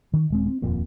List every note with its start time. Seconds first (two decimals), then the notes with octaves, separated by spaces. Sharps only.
0.13 D#3
0.30 D#1 G#3 C4
0.47 C4
0.62 D#1 F2 A#2 A#3